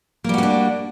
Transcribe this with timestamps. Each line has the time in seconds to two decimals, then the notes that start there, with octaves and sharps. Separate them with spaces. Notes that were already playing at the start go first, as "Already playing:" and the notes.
0.24 A#3
0.29 G3
0.34 F#4
0.38 C#4
0.43 D4